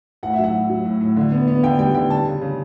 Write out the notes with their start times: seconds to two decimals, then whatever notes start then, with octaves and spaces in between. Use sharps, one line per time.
0.23 A2 F#5
0.33 F#3 E5
0.44 F#5
0.54 A2
0.70 F#3
0.85 A2
1.01 A2
1.16 D3
1.32 B3
1.47 B3
1.63 D3 G5
1.79 G3 G5
1.95 D3 G5
2.10 G3 A5
2.26 C#3
2.41 C#3